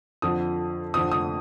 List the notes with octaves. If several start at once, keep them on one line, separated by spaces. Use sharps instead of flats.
F2 D3 F3 D#6
F2 D3 F3 C4 D#6
D#6